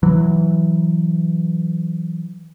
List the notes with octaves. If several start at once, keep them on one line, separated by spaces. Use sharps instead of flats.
E3 F#3